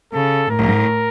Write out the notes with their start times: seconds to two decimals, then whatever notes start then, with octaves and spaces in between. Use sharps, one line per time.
0.13 C#3 A4
0.50 A2 A#4